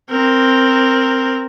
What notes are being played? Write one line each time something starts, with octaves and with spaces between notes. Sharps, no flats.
C4 A#4